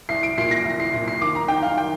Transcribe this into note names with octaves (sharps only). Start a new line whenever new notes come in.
C2 C7
D7
A#2 C7
A#6
C2
C7
A#2
C7
D#2 D6
A#5
D#3 G5
F5
G5